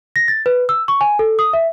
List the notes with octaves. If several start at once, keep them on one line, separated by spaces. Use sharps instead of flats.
A#6
A6
B4
E6
C#6
G#5
A4
D#6
E5